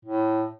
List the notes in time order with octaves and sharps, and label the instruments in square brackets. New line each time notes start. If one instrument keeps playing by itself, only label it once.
[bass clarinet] A2